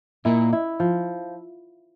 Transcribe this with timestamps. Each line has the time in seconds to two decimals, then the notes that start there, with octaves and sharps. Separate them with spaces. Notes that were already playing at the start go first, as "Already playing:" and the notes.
0.25 A#2 A#3 E4
0.53 E4
0.80 F3